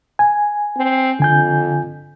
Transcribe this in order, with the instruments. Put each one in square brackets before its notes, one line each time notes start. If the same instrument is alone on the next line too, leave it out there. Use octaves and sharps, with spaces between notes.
[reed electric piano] G#5
[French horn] C4
[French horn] F2 [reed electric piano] D3 G#5 G6